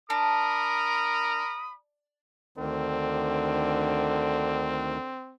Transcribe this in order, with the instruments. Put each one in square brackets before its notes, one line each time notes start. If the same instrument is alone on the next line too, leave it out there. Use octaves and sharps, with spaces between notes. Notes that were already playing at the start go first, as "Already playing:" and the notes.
[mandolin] D4 [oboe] A#4 [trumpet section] B5 D#6
[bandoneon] D2 D#3 [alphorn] D3 [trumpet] C4